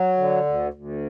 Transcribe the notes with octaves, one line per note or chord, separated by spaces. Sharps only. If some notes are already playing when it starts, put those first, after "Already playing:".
Already playing: F#3
D3
D2
D2